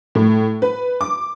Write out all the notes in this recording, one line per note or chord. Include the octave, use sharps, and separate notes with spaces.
A2
B4
D6